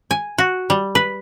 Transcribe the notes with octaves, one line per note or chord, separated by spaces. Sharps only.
G#5
F#4
G3
B4